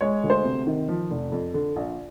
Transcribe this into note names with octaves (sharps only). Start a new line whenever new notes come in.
G#3 C#5
D2
C5
C3
D#3
F3
F1
F2
D3
A#1